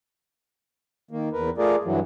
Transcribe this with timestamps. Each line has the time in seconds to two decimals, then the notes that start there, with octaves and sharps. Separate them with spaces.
1.11 D#3 A#3
1.32 E2 A#4 B4
1.58 A3 F4 G#4 A#4 D5
1.84 G2 E3 F#3